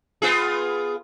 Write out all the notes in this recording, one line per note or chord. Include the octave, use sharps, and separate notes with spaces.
B3 F4 G#4